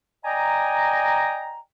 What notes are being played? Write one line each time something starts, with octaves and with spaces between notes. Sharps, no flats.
D5 D#5 G5 G#5 A#5